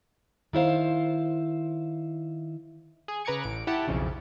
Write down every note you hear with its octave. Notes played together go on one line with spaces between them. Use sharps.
D#3 E4 C5 F5
G#4
C#3 B4 A#5 D6 G#6 C#7
A1 D7
E4 G4 F#5 A5
B1 F2 C#3